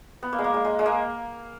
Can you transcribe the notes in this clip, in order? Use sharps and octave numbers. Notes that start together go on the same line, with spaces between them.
B3
A#3
G#3
A#3
G#3
G#3
G#3
A#3